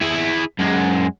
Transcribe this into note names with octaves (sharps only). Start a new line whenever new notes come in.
E4 G#4
F#2 G#3